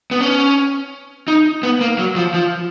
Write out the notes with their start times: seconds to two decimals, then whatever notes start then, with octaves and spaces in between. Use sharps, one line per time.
0.11 B3
0.20 C#4
1.28 D#4
1.63 B3
1.81 A#3
1.99 F#3
2.16 F3
2.34 F3